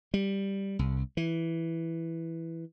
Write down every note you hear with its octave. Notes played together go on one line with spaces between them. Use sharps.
G3
C2
E3